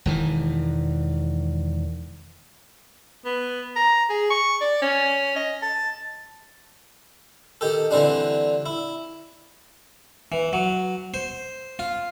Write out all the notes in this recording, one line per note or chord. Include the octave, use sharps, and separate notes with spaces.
E1 D#3 E3
B3
A#5
G#4
C#6
D5
C#4
D#5
A5
D#3 G4 A4
D3 E3 G3 C4 D4
E4
E3
F#3
C5
F4